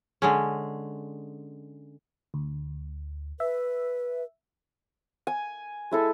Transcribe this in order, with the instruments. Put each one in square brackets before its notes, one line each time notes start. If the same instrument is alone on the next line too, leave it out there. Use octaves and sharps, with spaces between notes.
[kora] D3 G#3 C#4
[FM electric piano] D2
[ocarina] B4 [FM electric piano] E5
[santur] G#5
G#3 E4 A4